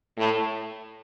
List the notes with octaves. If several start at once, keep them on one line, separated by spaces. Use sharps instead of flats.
A2